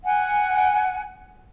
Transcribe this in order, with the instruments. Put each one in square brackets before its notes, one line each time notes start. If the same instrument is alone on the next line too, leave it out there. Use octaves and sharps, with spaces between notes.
[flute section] F#5 G#5